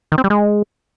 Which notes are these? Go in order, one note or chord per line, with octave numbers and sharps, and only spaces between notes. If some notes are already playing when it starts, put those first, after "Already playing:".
D#3
C4
G3
G#3